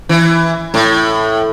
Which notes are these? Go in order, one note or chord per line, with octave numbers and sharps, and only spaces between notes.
E3
A2